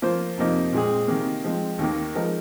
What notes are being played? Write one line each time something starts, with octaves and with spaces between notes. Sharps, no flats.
F3 A#3 F4 C5
F2 C3 F3 A#3 D#4
A#2 G#3 C4 G#4
C3 D#3 A#3
F3 G#3 C4
D#2 D#3 A#3
F3 G#3 D#4 A#4